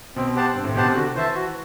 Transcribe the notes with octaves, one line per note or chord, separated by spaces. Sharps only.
B2 C4
G4 C5 F#5 A5
G2 C4
A2
B2 G4 C5 F#5 A5
C3
D3 F#4
E3 C5 E5 A5
F#4